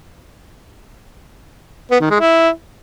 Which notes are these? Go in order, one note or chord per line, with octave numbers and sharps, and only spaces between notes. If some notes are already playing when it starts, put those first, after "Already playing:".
B3
D#3
G#3
E4